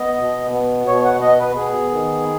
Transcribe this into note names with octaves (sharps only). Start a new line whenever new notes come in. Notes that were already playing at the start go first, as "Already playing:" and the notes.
Already playing: B3 D#5
B2
B3
B2 C#5
F#5
B3 D#5
B4
B3 G#4
D#3